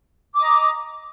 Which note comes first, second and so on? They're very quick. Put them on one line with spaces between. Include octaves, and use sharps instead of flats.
D6 D#6 D#5 A#5